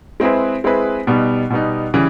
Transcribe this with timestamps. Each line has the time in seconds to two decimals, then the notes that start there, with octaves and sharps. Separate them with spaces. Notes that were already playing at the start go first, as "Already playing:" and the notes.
0.20 G#3 C4 E4 G#4 B4
0.64 G#3 C4 E4 G#4 B4
1.07 B2 G3 B3 D#4
1.50 B2 G3 B3 D#4
1.94 C#3 E3 G3